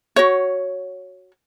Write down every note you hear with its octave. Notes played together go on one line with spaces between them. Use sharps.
F#4 C#5